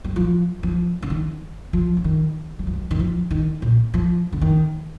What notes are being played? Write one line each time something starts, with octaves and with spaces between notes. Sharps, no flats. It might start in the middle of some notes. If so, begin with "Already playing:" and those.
G3
F3
F3
D3
D#3
F3
D3
D#3
G3
F3
G3
D#3
F3
D#3
A#2
F3
D3
D#3